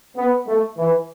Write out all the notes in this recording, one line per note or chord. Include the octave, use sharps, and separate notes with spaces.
B3
A3
E3